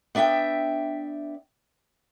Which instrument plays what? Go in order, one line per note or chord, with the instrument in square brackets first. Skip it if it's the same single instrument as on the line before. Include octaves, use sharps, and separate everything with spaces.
[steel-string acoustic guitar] B3 D4 E5 F#5 G5